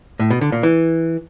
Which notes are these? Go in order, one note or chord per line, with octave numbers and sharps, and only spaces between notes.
A2
B2
D3
A#2
E3